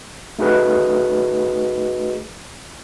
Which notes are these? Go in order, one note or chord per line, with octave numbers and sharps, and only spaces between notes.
A3 D#4 F#4 G#4 B4 D#5